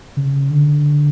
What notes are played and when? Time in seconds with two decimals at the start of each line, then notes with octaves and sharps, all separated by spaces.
0.17 C#3
0.50 D3